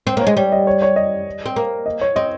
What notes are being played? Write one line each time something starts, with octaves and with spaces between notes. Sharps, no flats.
C4 C5
A#3
C#5
G#3
G3 C#5
D#5
C#5
C#5
D#5
C4
A#3
D#5
C#5
C4 D#5